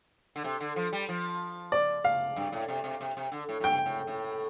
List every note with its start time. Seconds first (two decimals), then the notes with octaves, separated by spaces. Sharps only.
0.36 D3
0.44 C3
0.60 D3
0.76 F3
0.93 G3
1.09 F3
1.72 D5
2.05 F5
2.36 G2
2.52 A2
2.68 C3
2.84 C3
3.01 C3
3.17 C3
3.32 D3
3.49 A2
3.60 A2
3.64 G2 G5
3.86 A2
4.07 A2